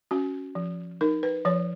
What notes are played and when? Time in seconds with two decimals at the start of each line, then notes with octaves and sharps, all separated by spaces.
0.11 C#4 F#4
0.55 F3
1.01 D#4 A#4
1.23 B4
1.45 F3 C#5